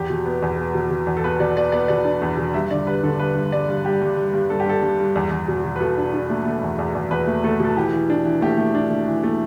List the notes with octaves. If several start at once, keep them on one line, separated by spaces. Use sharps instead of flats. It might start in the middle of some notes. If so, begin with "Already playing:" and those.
Already playing: E2 G4
B2
B3
E2
B3
B2
B2
E2
A4
B3 B4
B2 D5
B3 D5
B3 D5
B2 D5
D4
E2
B2
G2 E5
D3 D5
G3 B4
D3 A4
G3 B4
G2
G2 D5
G2
G3 G4
G2
G3
G2
G2 A4
G4
G2 A4
G2
G2
E2
E2
B2
B2
B4
B2 A4
D4
D4
A3
A3
E2
E2
E2
E2 B4
A3
A3 A4
B2 A4
E3 G4
E3
D4
E3
A3 G4
A3
D4
A3
E3
A3